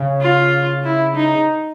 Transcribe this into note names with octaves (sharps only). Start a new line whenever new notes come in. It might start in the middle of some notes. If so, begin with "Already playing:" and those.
Already playing: C#3
F4
E4
D#4